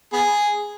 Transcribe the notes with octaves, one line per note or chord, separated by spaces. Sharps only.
B3 G#4